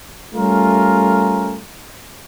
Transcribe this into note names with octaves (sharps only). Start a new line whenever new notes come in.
G3 A3 C#4 F4 A#4